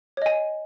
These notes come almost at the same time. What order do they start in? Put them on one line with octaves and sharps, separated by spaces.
C#5 D#5 G#5